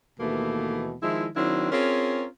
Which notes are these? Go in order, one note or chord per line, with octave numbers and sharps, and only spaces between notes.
D#2 B2 E3 A3 A#3
D#3 F3 G#3 E4
D#3 F#3 C4 D4 E4
C4 C#4 F4 G#4 A#4